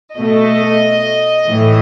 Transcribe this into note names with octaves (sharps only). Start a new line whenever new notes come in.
B2 A3 D#5
A2 E3 A3